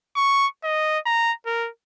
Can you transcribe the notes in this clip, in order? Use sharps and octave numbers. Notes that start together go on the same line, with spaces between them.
C#6
D#5
A#5
A#4